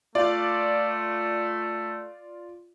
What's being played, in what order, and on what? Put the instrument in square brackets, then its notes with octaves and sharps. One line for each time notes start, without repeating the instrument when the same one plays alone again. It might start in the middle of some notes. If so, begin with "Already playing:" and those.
[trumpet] A3 [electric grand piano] F4 F5 [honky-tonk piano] D5